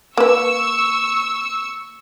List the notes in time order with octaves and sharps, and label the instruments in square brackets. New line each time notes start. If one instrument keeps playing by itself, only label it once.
[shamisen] A#3 B4 [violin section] C#6 E6